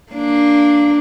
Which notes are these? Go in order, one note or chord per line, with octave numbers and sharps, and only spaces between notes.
A#3 D4